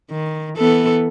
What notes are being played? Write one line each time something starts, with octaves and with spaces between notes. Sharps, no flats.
D#3
E3 B3 A4